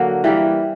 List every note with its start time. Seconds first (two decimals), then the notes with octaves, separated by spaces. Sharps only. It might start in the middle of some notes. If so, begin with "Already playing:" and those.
Already playing: D3 F#3 A#3
0.24 E3 G3 A#3